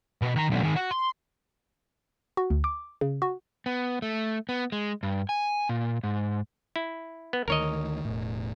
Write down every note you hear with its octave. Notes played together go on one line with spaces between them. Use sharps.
B2
D#3 A#5
B1 D3
D#3 G#4
F#4
C6
F#4
D2
D6
C#3
F#4
B3
A3
B3
G#3
G2
G#5
A#2
G#2
E4
B3
D2 D#3 A#4 C#5 D#5
E1 A2